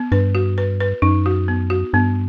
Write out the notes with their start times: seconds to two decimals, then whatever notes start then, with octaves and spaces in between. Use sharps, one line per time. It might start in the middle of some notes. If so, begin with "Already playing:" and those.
Already playing: B3
0.12 G2 B4
0.35 F#4
0.58 B4
0.80 B4
1.02 F#2 D#4
1.26 F#4
1.48 B3
1.70 F#4
1.93 G2 B3